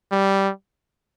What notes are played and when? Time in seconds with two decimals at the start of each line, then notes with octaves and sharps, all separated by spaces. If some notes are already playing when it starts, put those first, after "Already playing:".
0.12 G3